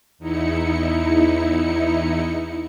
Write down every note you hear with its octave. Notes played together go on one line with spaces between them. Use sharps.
E2 D#4 E4 C#7